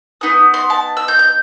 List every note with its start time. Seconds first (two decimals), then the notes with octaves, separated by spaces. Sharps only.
0.21 B3 D#4 D#6
0.54 C6
0.70 A5
0.97 E6
1.08 G6
1.19 G6